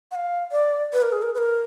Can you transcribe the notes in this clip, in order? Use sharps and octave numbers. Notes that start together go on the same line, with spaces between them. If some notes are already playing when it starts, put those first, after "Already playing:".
F#5
F5
D5
B4
A#4
G#4
A#4
B4
A#4